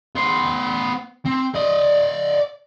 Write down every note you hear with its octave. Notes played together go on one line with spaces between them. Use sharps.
B3 C5
C4
D5 D#5